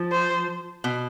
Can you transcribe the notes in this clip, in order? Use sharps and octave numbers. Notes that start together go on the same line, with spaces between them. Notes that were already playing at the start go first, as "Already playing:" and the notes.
Already playing: F3
C5
B2